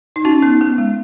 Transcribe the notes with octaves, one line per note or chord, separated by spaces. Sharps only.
D#4
C#4 F#4
B3 D#4
B3
G#3